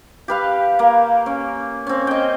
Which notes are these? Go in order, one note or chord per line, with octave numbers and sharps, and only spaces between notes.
G4 B4 F5
A#3
C#4
C4 C#4
D#5 G5